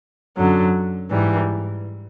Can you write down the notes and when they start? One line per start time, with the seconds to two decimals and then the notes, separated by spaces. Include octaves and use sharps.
0.37 F#2 D3 F#3
1.11 G#2 E3 G3